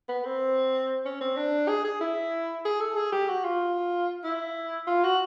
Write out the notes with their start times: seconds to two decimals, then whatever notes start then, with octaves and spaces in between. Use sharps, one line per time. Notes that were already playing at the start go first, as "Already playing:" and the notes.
0.09 B3
0.25 C4
1.05 C#4
1.21 C4
1.37 D4
1.68 G#4
1.84 G#4
2.01 E4
2.65 G#4
2.81 A4
2.97 G#4
3.12 G4
3.29 F#4
3.44 F4
4.24 E4
4.87 F4
5.04 F#4